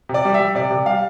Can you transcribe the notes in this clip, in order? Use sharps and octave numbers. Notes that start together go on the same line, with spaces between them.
C3
D5
G3
E5
G3
C3 D5
C3
G3 F5